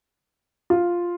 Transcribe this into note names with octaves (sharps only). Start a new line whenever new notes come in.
F4